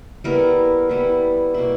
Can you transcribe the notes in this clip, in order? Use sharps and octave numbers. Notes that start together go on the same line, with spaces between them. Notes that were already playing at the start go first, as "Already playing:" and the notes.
G3 B3 E4 A#4
G3 B3 E4
B2 A#3 E4